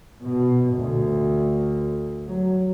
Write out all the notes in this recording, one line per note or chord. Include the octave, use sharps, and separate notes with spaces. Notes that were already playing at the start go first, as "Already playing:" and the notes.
B2
D2
F#3